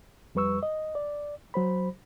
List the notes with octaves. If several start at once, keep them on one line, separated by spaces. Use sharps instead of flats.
F2 G3 B4 C#6 E6
D#5
D5
F#3 C5 B5